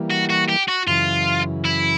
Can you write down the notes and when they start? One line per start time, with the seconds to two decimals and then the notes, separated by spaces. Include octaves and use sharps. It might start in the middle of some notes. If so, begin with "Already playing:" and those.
Already playing: E3 G3 A#3
0.10 F#4
0.30 F#4
0.49 G4
0.68 F#4
0.87 F#2 C#3 E3 F4
1.65 E4